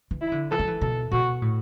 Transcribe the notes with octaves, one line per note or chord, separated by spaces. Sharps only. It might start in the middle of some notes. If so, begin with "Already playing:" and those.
E3
E4
D3
E3 A4
F#3
E3
B2 A4
B2 F#4
A2